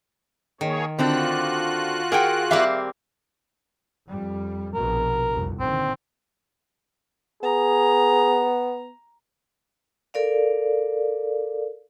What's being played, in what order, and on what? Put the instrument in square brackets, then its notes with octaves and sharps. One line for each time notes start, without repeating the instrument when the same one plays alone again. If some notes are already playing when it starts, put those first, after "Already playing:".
[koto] D#3 [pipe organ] A#3 G#4 C#5
[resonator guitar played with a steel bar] D3 C4 D4 [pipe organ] F4 F#4 F#6
[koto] G#4 [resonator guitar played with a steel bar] A#4 F#5 G5
[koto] G3 A#3 C4 [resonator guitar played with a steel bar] E5 F5
[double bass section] F2 G3
[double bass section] A#1 B2 [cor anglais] A#4
[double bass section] G1 C2 F2
[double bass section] A#2 D3 D#3 [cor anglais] C4
[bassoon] B3 [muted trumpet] G#4 [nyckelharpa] A#5
[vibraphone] A4 A#4 D5 F5